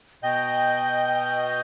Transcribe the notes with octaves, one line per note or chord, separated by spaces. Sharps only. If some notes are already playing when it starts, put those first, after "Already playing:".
B2 D#5 G5 G6